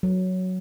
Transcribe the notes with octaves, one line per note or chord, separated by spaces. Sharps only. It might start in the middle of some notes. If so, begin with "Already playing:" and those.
F#3